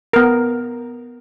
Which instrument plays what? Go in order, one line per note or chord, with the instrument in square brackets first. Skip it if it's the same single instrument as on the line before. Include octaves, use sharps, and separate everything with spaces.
[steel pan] B3 A#4